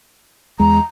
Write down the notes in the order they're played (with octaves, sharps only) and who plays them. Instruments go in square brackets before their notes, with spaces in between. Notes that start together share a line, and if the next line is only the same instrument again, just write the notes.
[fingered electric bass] E2 G#3 [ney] A#5